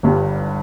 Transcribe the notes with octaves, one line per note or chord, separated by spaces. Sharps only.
G1 G2 G3